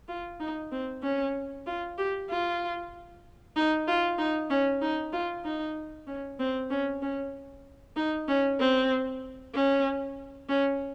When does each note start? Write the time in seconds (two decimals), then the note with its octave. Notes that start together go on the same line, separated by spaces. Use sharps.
0.08 F4
0.40 D#4
0.72 C4
1.03 C#4
1.67 F4
1.98 G4
2.30 F4
3.56 D#4
3.88 F4
4.18 D#4
4.50 C#4
4.82 D#4
5.13 F4
5.44 D#4
6.07 C#4
6.39 C4
6.70 C#4
7.02 C#4
7.96 D#4
8.28 C#4
8.59 C4
9.55 C#4
10.49 C#4